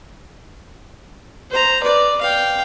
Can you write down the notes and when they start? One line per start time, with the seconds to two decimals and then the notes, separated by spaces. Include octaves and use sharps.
1.51 C5 A#5
1.83 B4 D5
2.21 F5 G5